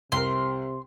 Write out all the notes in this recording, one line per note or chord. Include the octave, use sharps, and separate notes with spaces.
C2 C3 A#4 C6